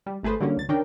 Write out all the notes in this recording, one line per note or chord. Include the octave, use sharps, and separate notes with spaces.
G3
G#1 A3 G#4 B4 C5
D3 F#3 G3 A#3 C#4
C#2 A6
D#3 C#4 D4 A#4 G5